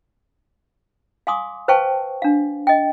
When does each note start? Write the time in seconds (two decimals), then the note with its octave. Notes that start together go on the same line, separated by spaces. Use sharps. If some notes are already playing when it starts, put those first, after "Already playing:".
1.27 F5 G#5 C6 D6 D#6
1.68 B4 C5 F5 G5 A5 C#6
2.22 D4 F5
2.67 D#5 G5